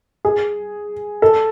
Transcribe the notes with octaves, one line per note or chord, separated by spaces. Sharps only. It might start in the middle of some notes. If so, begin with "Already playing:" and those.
G#4
A4